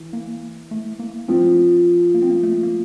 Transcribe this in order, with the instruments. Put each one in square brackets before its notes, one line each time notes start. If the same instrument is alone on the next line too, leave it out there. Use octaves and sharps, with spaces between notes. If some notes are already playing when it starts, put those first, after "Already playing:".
Already playing: [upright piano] E3
[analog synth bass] A#3
A3
A#3
[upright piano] F3 [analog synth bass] C4
[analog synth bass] A#3
C4
A#3
A3
A#3